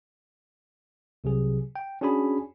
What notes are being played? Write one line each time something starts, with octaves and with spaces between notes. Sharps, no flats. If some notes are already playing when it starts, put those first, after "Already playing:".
C2 C3 F#3 G#4
G5
C#4 D4 F#4 G#4 G#5 B5